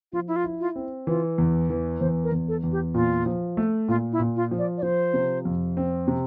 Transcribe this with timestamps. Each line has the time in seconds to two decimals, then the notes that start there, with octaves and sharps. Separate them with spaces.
0.13 F3 F4
0.28 E4
0.36 F4
0.44 E4
0.60 F4
0.76 C4
1.07 E3 F4
1.38 E2
1.70 E3
2.00 E2 C5
2.24 A#4
2.32 E2
2.48 A4
2.64 E2
2.72 G4
2.94 A#2 F4
3.26 F3
3.57 A3
3.88 A#2 F4
4.12 E4
4.20 A#2
4.36 F4
4.51 F3
4.58 D5
4.78 D5
4.82 F3 C5
5.14 C3
5.45 F2
5.77 C4
6.08 C3